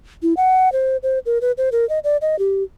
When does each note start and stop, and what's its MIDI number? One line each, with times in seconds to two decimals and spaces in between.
0.23 0.34 64
0.37 0.72 78
0.72 0.97 72
1.03 1.19 72
1.26 1.38 70
1.41 1.52 71
1.58 1.69 72
1.72 1.87 70
1.89 1.99 75
2.04 2.17 74
2.22 2.38 75
2.39 2.63 67